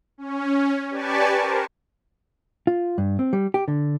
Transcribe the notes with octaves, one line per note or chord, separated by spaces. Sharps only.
C#4
G4 B4 D5 G#5 A5 C#6
A#4 C5
F4
G2
C4
G3
G4
D3